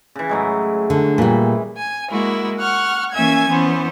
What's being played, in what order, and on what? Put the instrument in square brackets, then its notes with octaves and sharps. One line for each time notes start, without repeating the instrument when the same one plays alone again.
[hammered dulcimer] C#3 E3
A2 F#3 G#3
[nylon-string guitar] D3
[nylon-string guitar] A#2 G3 [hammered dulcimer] E3
[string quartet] G#5
G#3 A#3 E4 F#4
F#5 C#6 F6
E3 A#3 C#4 E5 G#5 G#6
E3 B3 C#4 C5